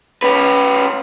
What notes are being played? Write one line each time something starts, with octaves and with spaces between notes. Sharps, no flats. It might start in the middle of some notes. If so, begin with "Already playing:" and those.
C#4 B4